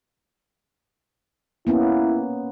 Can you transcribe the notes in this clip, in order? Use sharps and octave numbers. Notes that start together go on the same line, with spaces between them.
A#3 B3 C#4 E4